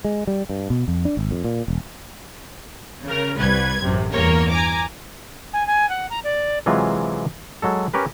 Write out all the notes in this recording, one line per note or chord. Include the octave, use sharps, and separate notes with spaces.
G#3
G3
G2
B2
F2
D4
G#1
F2
A#2
E1
C#3 A#4
C2 G3 B4 G#6
A1 F#2 C3
E2 G2 A#3 A#4 C#5
G#5 A#5 D6
G#5
G#5
F#5
A#5
D5
C3 E3 F#3 G#3 F4
F#3 G#3 A4
C#4 G4 A#4 B4